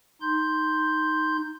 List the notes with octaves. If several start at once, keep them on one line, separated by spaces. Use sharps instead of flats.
D#4 C6 G6